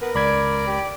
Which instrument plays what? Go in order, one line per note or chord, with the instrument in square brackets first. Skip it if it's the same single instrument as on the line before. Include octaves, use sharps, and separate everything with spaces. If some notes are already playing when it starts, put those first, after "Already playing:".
[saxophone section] B3 B4 [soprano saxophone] A#4
[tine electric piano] C#2 B5 G#6 [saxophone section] D5
[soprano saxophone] G4